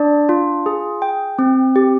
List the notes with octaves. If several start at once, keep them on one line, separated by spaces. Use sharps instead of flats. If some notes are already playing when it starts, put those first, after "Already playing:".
Already playing: D4 D5
F4
G#4
G5
C4
G4